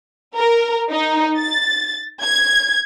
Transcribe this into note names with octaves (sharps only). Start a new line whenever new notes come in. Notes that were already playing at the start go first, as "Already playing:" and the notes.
A#4
D#4
A6
G#6